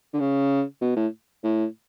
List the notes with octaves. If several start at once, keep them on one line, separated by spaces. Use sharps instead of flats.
D3
C#3
B2
A2
A2